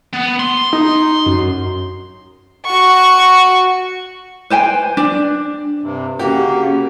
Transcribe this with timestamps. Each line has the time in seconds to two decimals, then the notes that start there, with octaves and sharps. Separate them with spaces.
0.13 B3
0.40 C6
0.73 D#4
1.26 F#2
2.65 F#4 C#6
4.50 B4 C5 G5 G#5
4.97 D4
5.82 G2 C3
6.19 C#3 A#3 F#4 G4